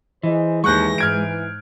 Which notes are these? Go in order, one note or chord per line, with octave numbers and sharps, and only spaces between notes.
E3 G#4 C5 D#5
D#2 E3 G#3 C#6 F#6 G6 A#6
G#2 F6 G#6 D7